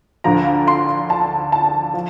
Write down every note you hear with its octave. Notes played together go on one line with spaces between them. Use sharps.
D2 D3 F3 A#5
C6
A5
A5
F3